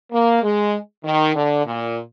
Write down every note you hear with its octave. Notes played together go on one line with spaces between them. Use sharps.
A#3
G#3
D#3
D3
A#2